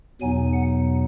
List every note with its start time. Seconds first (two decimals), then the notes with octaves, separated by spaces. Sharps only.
0.21 E2 B2 F#3 B3 D#4 G#5
0.53 F#5